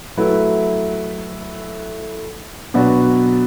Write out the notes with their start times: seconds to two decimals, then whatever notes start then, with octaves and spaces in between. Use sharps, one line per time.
0.17 F#3 A3 E4 B4
2.74 B2 F#3 B3 D4 F#4